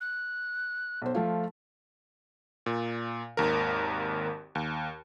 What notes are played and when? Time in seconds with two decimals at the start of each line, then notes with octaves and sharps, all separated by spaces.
0.01 F#6
1.02 B1 C5
1.15 F3 A3 F4
2.66 A#2
3.37 G#1 D#2 A#4
4.55 D#2